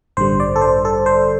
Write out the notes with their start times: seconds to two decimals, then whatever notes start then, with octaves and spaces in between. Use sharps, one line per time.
0.17 A1 G2 D3 G3 C5
0.40 D5
0.56 A4
0.61 C5
0.85 A4
1.06 C5